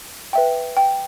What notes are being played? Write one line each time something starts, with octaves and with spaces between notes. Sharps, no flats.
B4 E5 G5
G5